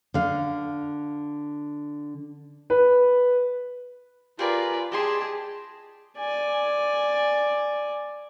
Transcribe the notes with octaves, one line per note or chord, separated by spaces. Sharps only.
D3 F5
B4
F4 G4 G#4 A#4 B4 D5
G4 G#4 D#5 G#5 A5 C6
D5 G#5